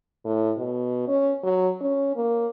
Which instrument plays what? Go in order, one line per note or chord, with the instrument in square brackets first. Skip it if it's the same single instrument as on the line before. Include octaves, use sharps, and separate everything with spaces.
[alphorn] A2
B2
C#4
F#3
C#4
A#3